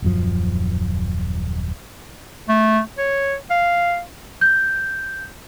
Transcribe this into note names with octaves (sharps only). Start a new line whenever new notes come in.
D#1 F#2 F3
A3
C#5
F5
G6